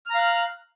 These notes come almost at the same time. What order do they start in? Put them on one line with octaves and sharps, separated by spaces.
F6 A#5 F5 F#6